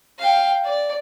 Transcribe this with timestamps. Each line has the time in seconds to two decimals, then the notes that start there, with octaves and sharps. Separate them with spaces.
0.19 F5 G5
0.64 D5